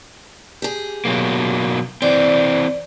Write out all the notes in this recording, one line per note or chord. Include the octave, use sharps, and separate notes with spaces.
G4 G#4
B2 F#3 A#3
E3 C4 D5